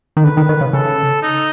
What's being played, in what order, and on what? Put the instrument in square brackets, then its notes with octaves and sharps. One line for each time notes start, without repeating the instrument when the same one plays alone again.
[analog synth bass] D#3
[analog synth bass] D3 [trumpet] B4
[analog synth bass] D#3
D#3
C#3
[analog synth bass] C#3 [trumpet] A4
[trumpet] D#4